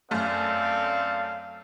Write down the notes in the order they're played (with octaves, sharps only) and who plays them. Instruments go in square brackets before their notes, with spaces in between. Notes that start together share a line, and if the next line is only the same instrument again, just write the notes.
[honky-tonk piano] F#2 A3 F6 [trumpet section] C4 A4 D5 [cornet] F5